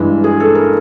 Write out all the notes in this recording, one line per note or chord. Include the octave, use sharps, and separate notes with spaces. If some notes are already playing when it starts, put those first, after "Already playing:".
Already playing: G2 E3 G#3
G#4
A4
A#4